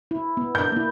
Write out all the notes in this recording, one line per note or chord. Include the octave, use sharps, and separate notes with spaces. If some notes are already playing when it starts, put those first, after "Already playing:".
E4
B3
D4 G6
A#3 E4